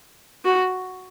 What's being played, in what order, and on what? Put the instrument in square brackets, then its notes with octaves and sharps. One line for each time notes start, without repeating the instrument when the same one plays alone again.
[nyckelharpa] F#4